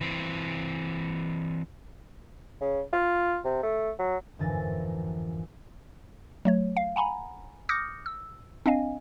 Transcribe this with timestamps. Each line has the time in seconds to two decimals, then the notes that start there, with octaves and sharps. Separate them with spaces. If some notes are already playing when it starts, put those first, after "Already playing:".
0.01 E3 C4
2.61 C#3
2.93 F4
3.44 C3
3.63 A3
3.99 F#3
4.39 G1 F2 G#2 E3 A#4 A6
6.45 F#3 A3 C#5
6.77 F5
6.96 F#5 G#5 A#5 B5
7.69 D6 D#6 F6 G6 A#6 C#7
8.06 E6
8.66 C4 D4 D#5 F5 G#5